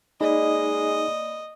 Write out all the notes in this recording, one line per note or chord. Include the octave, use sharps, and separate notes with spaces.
G#3 A#3 D#4 D5 D#5 B5